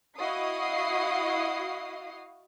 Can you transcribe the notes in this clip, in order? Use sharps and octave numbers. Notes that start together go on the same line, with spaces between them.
E4 F#4 D#5 F5 D#6 C7